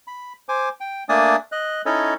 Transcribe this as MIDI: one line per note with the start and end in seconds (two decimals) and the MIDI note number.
0.07 0.33 83
0.49 0.69 72
0.49 0.69 80
0.49 0.69 86
0.80 1.04 79
1.09 1.36 57
1.09 1.36 58
1.09 1.36 62
1.09 1.36 74
1.09 1.36 80
1.09 1.36 87
1.52 1.82 75
1.52 1.82 90
1.86 2.14 61
1.86 2.14 63
1.86 2.14 64
1.86 2.14 69
1.86 2.14 73
1.86 2.14 75